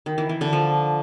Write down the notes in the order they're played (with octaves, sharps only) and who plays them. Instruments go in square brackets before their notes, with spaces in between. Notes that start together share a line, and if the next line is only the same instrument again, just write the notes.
[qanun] D#3
E3
E3
D3
F3